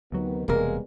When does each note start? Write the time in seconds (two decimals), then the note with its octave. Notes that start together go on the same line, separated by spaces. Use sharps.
0.12 D2 C3 D#3 F#3 B3
0.48 E1 C3 G3 G#3 A#3 B3 A#4